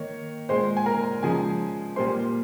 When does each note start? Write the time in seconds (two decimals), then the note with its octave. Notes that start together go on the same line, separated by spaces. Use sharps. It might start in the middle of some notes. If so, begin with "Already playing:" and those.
Already playing: D#3 A#3 C#5
0.49 A#2 G#3 C5 C6
0.77 G#5
0.86 A#4 A#5
1.23 C#3 F3 G#3 G#4 G#5
1.96 A#2 G3 A#3 C5 C6